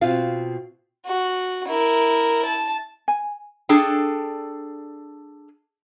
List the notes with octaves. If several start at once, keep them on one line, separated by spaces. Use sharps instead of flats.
B2 C4 F4 F5
F#4
E4 A#4
A5
G#5
D4 G#4 A4 G5